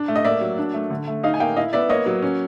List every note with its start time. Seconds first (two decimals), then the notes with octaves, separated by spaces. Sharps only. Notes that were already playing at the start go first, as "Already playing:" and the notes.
Already playing: D4
0.08 A3
0.16 D#5
0.25 A#3 D5 E5
0.41 F#3
0.58 D4
0.74 A3
0.90 D3
1.07 A3
1.23 D#4 D#5 F5
1.34 G#5
1.40 A#3 F5 G5
1.56 E4 D#5 F5
1.73 B3 D5 E5
1.89 A#3 C#5 D#5
2.06 F#3
2.22 C#4